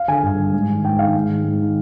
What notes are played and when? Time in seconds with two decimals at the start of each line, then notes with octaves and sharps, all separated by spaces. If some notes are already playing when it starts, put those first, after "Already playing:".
Already playing: F5
0.08 D3 G#5
0.23 G2
0.38 D3
0.53 G#2
0.69 D#3
0.85 G#2 G5
0.99 D#3 F5
1.15 G#2
1.29 D#3
1.44 G#2
1.61 D#3